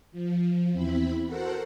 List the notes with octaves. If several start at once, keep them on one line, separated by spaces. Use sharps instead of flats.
F3
E2 C4 E4 B5
F#4 A4 A#4 C5 F#5